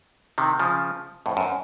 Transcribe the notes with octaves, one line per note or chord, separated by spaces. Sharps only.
C3 D#3
C#3 F3
F2 A2
F#2